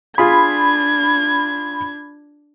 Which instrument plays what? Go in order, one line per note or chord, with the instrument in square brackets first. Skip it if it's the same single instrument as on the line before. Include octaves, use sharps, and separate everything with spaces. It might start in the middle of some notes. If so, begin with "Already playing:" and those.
[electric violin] D4 G#6 [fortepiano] F4 G#4 [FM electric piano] B5